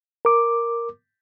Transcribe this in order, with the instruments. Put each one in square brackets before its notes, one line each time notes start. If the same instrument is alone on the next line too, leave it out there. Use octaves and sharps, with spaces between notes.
[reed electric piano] A#4 D6